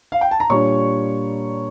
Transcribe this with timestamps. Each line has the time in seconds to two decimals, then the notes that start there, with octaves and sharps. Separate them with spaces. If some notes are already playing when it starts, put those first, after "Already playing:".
0.12 F5
0.21 G5
0.31 A5
0.40 A#5
0.50 A#2 G3 D4 C#5 C#6